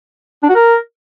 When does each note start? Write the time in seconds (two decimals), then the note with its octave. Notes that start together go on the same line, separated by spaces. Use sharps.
0.43 D4
0.49 F#4
0.55 A#4